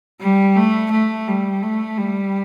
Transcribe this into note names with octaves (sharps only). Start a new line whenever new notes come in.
G3
A3
A3
G3
A3
G3